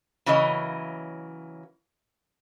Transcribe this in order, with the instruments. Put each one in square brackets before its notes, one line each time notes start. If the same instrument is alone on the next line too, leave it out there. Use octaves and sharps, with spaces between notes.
[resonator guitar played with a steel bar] C#3 E3 F#3 A#3 D#5